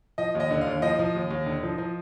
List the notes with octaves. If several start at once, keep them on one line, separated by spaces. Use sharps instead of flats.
F3 D#5
D#2 D#5
D3
F5
D#2
F3 D#5
F3
D#2
D#2
D3
F3
F3